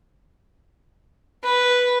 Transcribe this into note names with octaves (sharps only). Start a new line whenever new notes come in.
B4